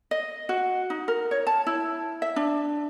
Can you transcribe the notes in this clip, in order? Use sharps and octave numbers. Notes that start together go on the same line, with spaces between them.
D#5
F#4
D#4
A#4
C#5
A5
E4
E5
D4